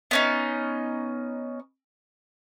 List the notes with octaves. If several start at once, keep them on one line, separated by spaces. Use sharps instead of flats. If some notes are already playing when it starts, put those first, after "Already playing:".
B3 C#4 D#4